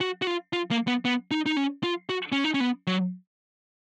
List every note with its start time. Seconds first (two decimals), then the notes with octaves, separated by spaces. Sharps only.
0.01 F#4
0.22 F#4
0.27 F4
0.53 F4
0.71 A#3
0.87 B3
1.05 B3
1.31 D#4
1.46 D#4
1.57 C#4
1.83 F4
2.09 F#4
2.32 C#4
2.44 D#4
2.54 C#4
2.60 B3
2.87 F#3